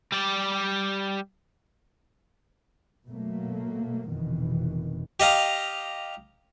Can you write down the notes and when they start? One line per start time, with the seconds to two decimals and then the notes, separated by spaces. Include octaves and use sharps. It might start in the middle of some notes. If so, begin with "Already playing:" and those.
0.12 G3 D5
3.07 B2 F#3 A3 A#3
4.11 F1 F2 B2 D#3 E3
5.20 G4 D#5 F5 A#5